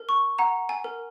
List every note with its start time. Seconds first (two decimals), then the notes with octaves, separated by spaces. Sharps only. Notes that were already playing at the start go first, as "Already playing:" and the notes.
Already playing: A#4
0.09 C#6
0.38 F#5 A#5
0.69 G#5
0.84 A#4